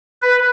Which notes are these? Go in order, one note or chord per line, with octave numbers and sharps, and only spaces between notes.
B4